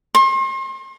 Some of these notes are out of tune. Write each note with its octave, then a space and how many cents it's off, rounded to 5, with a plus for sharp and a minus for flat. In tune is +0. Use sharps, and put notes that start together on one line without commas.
C6 +40